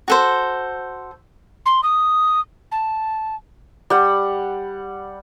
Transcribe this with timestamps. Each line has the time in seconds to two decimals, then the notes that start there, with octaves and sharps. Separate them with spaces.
0.08 F#4 A4 C5
1.66 C6
1.83 D#6
2.72 A5
3.90 G3 F#5